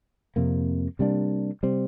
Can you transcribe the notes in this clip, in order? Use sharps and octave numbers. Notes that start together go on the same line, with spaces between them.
F2 C3 A#3
C3 G3 A#3 D4
C3 G3 C4